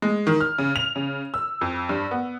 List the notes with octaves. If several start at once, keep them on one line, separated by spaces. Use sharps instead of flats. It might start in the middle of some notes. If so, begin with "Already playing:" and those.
G#3
D#3
F6
C#3
F7
C#3
E6
F2
G2
B3